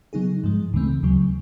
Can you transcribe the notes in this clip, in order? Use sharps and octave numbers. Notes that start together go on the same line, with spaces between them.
C#3 F#3 B3 D#4 G#4
G#2 F3 G#3
C#2 C#3 E3 A3 C4
D2 C#3 F#3